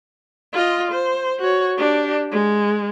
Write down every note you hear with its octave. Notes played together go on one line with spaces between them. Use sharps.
F4 D#5
C5
F#4 C#5
D4 G4
G#3